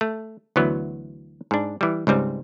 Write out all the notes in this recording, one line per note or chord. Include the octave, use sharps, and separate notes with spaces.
A3
D2 E3 F#3 B3
G#2 D4
E3 G3
C#2 G#2 G3 C4